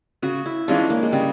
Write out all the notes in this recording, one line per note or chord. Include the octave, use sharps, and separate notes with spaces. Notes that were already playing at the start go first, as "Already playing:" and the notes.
C#3 F#4
E4
E3 G#3 C#4 D4 F4
A#3
G#3
C#3 G3